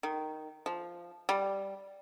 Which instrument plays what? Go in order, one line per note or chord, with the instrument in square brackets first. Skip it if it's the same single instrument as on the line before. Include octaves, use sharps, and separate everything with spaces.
[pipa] D#3
F3
G3